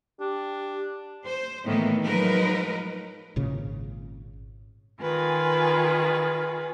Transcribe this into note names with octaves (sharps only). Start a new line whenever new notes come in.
D4 G4
C5
A2 D#3 E3 A#3 B3
F3 F#3 G#3 D#4 A#4 B4
G#1 A#2 C#3
D#3 F4 G#4 B4